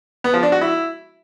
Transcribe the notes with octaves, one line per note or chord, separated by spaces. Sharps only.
B3
F3
D4
F#4
E4